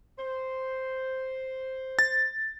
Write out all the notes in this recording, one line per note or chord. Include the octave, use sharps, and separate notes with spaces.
C5
A6